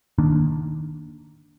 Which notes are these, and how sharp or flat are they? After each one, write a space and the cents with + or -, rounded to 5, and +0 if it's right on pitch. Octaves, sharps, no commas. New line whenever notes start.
D#3 -5 A#3 +0 D4 +0